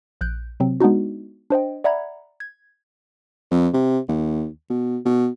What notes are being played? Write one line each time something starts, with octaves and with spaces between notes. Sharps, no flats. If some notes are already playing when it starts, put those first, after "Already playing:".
A#1 F#6 G6 D7
C3 F#3 C4
G#3 B3 D4 D#4 F#4
D4 C5 D#5 G5
D5 E5 F#5 A#5 B5 G#6
G#6
F2
C3
D#2
B2
B2